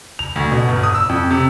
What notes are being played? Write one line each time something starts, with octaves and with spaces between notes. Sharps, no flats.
F7
D2
B2
G1
D#6
E6
F2
C3